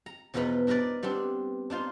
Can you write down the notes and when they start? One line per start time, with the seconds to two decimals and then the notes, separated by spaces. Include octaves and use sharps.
0.06 A#5
0.34 E2 B2 F3 D#4 B4 B5
0.67 D4 D#4 A#4 B4 D5
1.03 G3 B3 C4 D4
1.70 D4 D#4 F4 C5